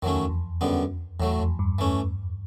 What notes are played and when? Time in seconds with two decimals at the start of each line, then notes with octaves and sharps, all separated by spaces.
0.02 F2 D#3 F#3 A3 C#4
0.15 E2
0.29 F2
0.61 F#2 D3 G3 B3
1.20 E2 A2 F#3 A3
1.40 F2
1.59 G2
1.79 E3 A3 C#4